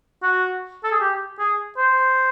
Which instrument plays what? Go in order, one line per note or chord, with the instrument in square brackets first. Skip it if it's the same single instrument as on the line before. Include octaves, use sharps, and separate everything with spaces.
[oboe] F#4
A4
G#4
G4
G#4
C5